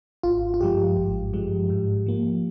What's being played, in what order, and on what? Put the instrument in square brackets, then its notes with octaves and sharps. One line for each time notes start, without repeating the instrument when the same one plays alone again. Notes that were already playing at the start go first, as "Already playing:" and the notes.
[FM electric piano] G#1 F4
F4
G2 F3 G#3 G4
G#1
G2 F3 G#3
G#2
F3 A#3